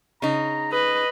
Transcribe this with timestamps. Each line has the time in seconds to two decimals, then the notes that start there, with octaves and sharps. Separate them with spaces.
0.22 C#3 D#4 A#5
0.72 B4 D#5